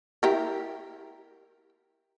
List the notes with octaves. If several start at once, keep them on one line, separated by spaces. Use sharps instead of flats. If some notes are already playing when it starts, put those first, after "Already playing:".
E4 G4 A#4